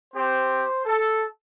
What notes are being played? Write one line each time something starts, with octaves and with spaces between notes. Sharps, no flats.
C4 G4 C5
A4